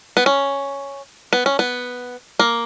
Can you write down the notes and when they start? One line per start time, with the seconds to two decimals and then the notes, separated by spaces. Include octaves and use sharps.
0.17 B3
0.26 C#4
1.33 B3
1.46 C#4
1.59 B3
2.39 A#3